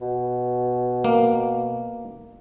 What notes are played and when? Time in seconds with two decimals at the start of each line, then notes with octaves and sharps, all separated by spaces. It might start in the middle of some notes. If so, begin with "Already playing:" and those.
0.01 B2
1.04 A#3